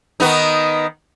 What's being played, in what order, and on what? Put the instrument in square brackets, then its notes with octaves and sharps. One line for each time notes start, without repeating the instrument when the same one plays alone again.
[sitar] D#3 B3 D#4